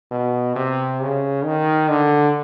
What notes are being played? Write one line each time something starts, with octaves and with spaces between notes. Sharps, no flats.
B2
C3
C#3
D#3
D3